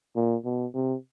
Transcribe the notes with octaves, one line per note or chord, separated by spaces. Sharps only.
A#2
B2
C3